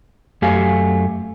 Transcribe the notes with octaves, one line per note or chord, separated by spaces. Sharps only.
F#2 A3 G4 F5 G#5